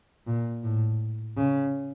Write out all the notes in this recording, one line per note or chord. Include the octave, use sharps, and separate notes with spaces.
A#2
A2
C#3